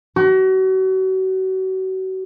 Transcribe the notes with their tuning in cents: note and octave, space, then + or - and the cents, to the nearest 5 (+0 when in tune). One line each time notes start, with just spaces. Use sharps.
F#4 +35